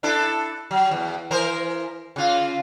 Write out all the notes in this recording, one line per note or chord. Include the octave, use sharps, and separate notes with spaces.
D4 E4 A4
F#3
E2
E3 A#4 C5
C#3 F4